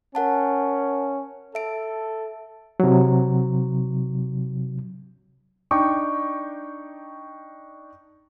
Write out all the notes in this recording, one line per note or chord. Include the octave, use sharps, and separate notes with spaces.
C#4 A#4 F#5 A5
A4 E5 D7
C3 F#3
D4 D#4 G5 C#6 D6